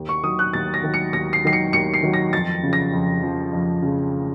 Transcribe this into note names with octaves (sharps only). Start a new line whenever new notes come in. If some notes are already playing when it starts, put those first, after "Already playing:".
Already playing: D#2
C#6
D#3 F#3 D#6
F#6
D#2 A6
A#6
D#3 F#3
C#7
D#2 A#6
C7
D#3 F#3 C7
C#7
D#2 C#7
C7
D#3 F#3
A#6
F2 A6
C#3 F3
A#6
F2
C#3 F3
F2
C#3 F3